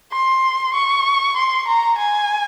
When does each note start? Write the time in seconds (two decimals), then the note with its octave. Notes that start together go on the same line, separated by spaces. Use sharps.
0.12 C6
0.74 C#6
1.36 C6
1.68 A#5
1.98 G#5